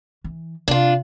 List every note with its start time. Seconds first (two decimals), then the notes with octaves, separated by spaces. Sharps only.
0.24 E3
0.68 C3 D4 F4